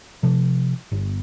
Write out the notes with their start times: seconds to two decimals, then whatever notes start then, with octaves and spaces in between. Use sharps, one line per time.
0.23 C3 F3
0.92 G1